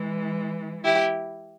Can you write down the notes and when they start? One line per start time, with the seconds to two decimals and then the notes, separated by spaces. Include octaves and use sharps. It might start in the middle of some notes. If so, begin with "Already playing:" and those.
Already playing: E3 G#3
0.84 E4 G4